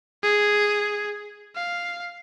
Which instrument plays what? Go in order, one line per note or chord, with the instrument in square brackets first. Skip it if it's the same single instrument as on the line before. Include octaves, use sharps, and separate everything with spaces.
[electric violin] G#4
F5